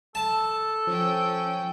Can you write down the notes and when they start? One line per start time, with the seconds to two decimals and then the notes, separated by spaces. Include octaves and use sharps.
0.15 A4 A5
0.87 F3 C#4 G5